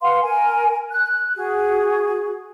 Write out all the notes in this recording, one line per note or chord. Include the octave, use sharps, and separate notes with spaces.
B4 F5 F#5 C6
A#4 G#5
F#6
F#4 G#4